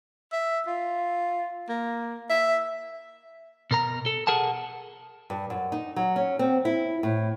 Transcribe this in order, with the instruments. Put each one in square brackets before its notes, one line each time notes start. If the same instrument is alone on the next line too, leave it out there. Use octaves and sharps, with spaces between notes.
[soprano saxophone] E5
F4
A#3
E5
[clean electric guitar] B2 A#4 A#5
A4
G#4 A#4 F#5 A5
[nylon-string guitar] G2
F#2
D#4
F#3
C#4
C4
E4
A2